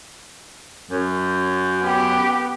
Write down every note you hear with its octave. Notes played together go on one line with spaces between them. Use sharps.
F#2
B3 G4